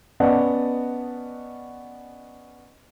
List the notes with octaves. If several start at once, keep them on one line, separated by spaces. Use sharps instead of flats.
B3 C#4 D5 D#5 F#5 A5